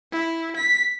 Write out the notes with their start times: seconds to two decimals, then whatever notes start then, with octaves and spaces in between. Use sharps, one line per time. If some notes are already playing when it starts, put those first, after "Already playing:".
0.12 E4
0.56 B6